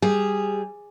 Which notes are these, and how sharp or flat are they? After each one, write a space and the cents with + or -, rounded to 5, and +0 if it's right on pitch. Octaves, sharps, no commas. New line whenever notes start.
G3 +0 G#4 -5